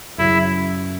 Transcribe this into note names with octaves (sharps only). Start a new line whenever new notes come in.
F#2 C#3 F#3 E4